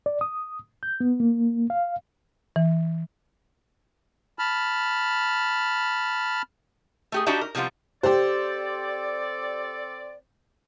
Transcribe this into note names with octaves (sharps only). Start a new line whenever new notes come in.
D5
D#6
G6
B3
A#3
F5
E3
A5 B5 F6
A3 G4 G#4
D4 D#4 F#4 G4 D5 E5
A#4
C3 F3 G3 B3 F4
C4 G4 A4 C5 D5